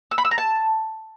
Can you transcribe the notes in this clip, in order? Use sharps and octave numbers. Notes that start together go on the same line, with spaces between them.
E6
B5
E6
A#5
A5